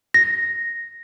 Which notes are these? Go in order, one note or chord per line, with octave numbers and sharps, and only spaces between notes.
A#6